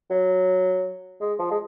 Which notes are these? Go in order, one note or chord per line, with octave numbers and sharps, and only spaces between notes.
F#3
G#3
F3
G#3